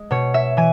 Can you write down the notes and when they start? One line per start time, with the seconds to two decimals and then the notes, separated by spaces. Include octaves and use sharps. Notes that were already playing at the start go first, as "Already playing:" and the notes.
Already playing: G#3
0.11 B2 C#5
0.34 E5
0.57 E3 G#5